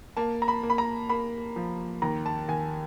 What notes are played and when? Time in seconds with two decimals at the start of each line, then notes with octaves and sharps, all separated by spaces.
0.17 A#3 A5
0.42 A#5
0.48 B5
0.63 A#3
0.70 B5
0.78 A#5
1.09 A#3 B5
1.56 F3
2.02 D#2 A#5
2.26 A5
2.49 D#2 G#5